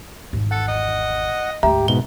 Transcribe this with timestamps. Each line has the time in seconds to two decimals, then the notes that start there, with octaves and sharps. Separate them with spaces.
0.33 G#1 E2
0.51 A4 F#5
0.68 D#5
1.63 D2 G#2 G4 E5 A#5
1.88 G#2 B2 G7